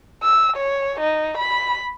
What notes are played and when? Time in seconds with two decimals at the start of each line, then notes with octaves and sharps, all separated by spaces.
0.23 E6
0.56 C#5
1.00 D#4
1.38 B5